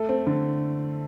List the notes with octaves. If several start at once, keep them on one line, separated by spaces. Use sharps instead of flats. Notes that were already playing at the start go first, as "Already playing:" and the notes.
Already playing: A3 A4
C4
D3